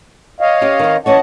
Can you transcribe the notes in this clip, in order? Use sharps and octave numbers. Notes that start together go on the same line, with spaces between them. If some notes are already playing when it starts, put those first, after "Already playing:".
C#5 D#5 F5
C#4 G4
D#3 C4
E3 C#4 C#5 D#5 F#5 A5